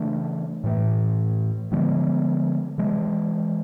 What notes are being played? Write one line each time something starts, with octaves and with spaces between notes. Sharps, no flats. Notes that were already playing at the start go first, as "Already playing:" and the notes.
Already playing: C#3 E3 A3 D4
A2 E3 A3
D3 F3 G#3 B3
C3 E3 G#3